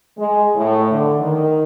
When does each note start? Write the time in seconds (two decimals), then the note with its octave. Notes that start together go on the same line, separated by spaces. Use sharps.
0.18 G#3
0.56 A2
0.91 D3
1.21 D#3